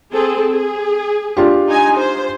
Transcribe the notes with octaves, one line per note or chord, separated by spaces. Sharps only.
C4 G#4 A4
G#4
D4 F4 G4
D#4 G#5
C5